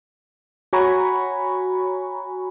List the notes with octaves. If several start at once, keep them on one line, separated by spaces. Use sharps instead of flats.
F#4 C#5 G#5 A#5 B5 C#6